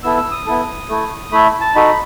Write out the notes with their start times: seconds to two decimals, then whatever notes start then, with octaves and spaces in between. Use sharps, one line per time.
0.03 B3 E4 A4 E6
0.18 E6
0.32 D#6
0.47 B3 E4 A4
0.89 A3 E4 A4
1.32 A3 E4 A4 B5
1.61 A5
1.75 D#4 F#4 A4 B5